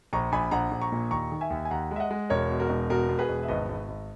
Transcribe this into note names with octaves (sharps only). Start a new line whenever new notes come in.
A#1 A#5 C#6
A#1 G#5 B5
A#1 F#5 A#5
A#1
A#5 C#6
A#2
D#2 A#5 C#6
D#3
E5 G#5
D#2
G#5
D#2 F#5 A#5
G#3 E5
D#5 F#5
G#3
E1 A#4 C#5
B2
F#4 A#4
E1
B2 F#4 A#4
B2
G#4 B4
E1
E5
G#1 B4 D#5
G#1
G#1